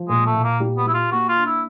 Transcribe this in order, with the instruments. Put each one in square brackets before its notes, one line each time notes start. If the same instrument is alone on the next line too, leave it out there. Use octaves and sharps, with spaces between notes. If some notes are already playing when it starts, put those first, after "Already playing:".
Already playing: [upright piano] F3
[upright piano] A#2 [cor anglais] G#3
[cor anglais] A3
[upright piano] A#2
[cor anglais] A#3
[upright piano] G3
[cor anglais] B3
[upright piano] G3 [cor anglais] E4
[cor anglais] F4
[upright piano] A#3 [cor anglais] F#4
[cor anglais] F4
[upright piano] D4
[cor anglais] E4